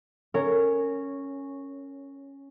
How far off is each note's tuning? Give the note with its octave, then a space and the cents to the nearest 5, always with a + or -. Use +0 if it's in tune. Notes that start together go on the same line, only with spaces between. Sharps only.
C#4 -5 A#4 -20 C#5 +10